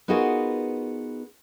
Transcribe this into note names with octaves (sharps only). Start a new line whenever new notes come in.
B3 D#4 F4 F#4 G#4 A#4